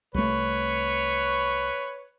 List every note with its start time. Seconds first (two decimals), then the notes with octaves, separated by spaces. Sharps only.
0.14 C2 A3 B4 C#5